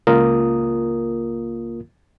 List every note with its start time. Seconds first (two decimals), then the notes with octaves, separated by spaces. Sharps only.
0.07 C#2 A#3 F4 A#4 D#6